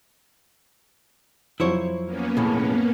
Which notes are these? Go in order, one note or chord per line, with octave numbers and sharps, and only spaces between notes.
F2 F3 F#3 E4 C5 C#5
A#3 B3 C#4
B1 A2 C#3